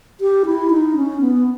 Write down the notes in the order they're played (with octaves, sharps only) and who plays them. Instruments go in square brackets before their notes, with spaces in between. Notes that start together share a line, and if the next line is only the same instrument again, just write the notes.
[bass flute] G4
E4
D#4
C#4
B3